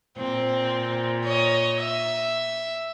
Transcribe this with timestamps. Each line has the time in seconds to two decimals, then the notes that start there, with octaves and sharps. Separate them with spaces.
0.18 A#2 C4
1.24 C#5 D#5
1.79 E5